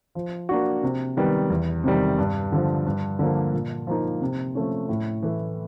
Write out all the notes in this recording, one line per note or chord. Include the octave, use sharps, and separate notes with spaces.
F3
A#3 D4 F#4
C3
D#3 G3 B3
E2
C3 D#3 G3
G2
D3 F3
G2
D3 F3 A#3
A#2
F3 A#3 D#4
C3
F3 A3 C#4
A2
E3 A3